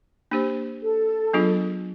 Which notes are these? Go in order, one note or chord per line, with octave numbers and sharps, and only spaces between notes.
A#3 D4 G4 C5
A4
F#3 B3 D4 F4 G#4